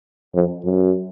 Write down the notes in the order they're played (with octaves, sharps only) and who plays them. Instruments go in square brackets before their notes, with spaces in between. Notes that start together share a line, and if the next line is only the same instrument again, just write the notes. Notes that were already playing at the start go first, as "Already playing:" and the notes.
[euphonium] F2
F#2